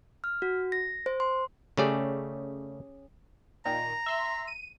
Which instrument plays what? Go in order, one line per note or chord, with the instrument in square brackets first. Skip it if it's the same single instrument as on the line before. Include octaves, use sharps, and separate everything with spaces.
[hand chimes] F6
F#4
A#6
C5
C6
[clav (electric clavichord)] C#3 A3 D5 [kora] C#4 G4 G#4
[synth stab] A#2 D#3 [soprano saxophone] A#5
[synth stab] E5 C6 E6
D#7